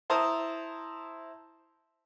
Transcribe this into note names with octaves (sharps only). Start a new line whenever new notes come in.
E4 C5 A5 A#5 D#6